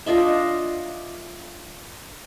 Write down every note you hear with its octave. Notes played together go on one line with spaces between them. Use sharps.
D4 F4 D#5 E5